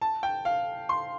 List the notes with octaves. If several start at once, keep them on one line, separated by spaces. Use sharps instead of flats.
A5
G5
F5
C6